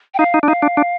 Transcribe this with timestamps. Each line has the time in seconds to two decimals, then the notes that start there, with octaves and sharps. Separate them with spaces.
0.14 G5
0.19 D#4 F5
0.34 D#4
0.43 D4
0.48 D#4 F5
0.62 D4
0.77 D4